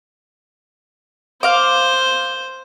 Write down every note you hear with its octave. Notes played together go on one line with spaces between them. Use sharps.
C5 F5 D6